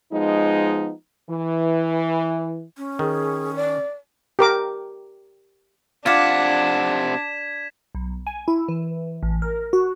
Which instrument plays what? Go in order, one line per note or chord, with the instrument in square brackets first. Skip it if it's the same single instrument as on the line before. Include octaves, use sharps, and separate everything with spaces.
[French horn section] F3 G#3 B3 D#4
E3
[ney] C#4
[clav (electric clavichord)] D#3 [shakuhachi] G#4
[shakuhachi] D5
[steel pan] G4 A#4 D6
[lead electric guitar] C3 F#5 [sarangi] D4 [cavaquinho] F4 D6 [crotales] G#6 B6 E7
[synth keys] B1
G#5
E4
E3
A1
A#4
F#4